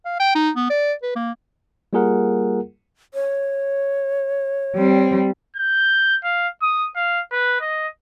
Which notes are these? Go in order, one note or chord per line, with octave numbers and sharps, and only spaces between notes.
F5
G5
D#4
B3
D5
B4
A#3
G3 A#3 F4 G#4 A#4 F#5
C#5
G3 C4
G6
F5
D#6
F5
B4
D#5